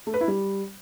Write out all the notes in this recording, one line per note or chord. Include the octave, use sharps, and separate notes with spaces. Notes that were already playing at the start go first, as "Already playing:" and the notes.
A3
B4
E4
G3